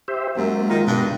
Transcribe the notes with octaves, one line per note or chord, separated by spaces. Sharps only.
G4 C5 E5
F#2 G#3 A#3
D#3 F4 A#4
G2 B2